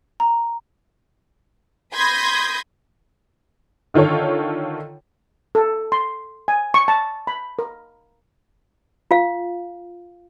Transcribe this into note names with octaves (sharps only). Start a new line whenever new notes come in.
A#5
B5 C6 D#6 G6 G#6 A#6
D3 D#3 F4 A4 C#5
A4
C6
G#5
C#6
A5
B5
A#4
F4 F5